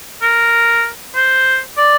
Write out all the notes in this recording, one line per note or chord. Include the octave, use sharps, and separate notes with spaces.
A#4
C5
D5